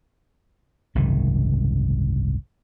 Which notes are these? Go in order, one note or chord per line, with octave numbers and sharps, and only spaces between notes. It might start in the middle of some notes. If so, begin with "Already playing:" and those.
F#1 C2 G#2 D#3